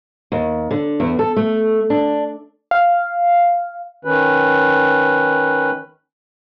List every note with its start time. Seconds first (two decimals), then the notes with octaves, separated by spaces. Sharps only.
0.32 D#2
0.71 D3
1.00 E2
1.19 A4
1.36 A3
1.90 D4
2.71 F5
4.05 D#3 C#4 B4